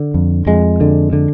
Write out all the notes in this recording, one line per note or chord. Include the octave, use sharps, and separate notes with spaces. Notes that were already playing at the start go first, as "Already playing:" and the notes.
Already playing: D3
F2
F2 G#3
D3
D3